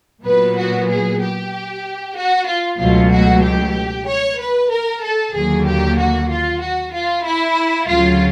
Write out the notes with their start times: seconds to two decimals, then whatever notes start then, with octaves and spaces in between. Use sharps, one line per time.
0.25 A#2 F#3 B3 B4
0.56 F#4
0.88 G#4
1.20 G4
2.16 F#4
2.47 F4
2.78 C#2 B2 F#3 A3 F4
3.11 F#4
3.42 G4
4.06 C#5
4.38 B4
4.70 A#4
5.02 A4
5.33 D#2 D3 F#3 A#3 G#4
5.65 G4
5.97 F#4
6.29 F4
6.61 F#4
6.93 F4
7.24 E4
7.88 D2 C#3 F#3 F4